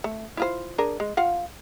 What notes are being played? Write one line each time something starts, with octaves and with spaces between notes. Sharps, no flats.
A3
E4 F4 C5
D4 G#4 A#4
G#3
F4 F5 F#5